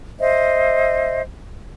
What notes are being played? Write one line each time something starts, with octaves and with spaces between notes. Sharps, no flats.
C5 D#5 E5